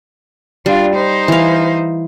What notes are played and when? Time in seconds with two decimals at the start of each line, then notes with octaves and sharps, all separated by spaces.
0.66 G3 D4 F4
0.95 D#4 C5
1.28 E3 F5